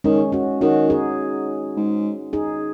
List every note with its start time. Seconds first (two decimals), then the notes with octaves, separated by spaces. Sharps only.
0.04 D#3 G#3 C#4
0.32 C#4 F#4
0.61 D#3 C#4 F#4
0.90 D#4 G#4
1.76 G#2
2.33 D#4 G#4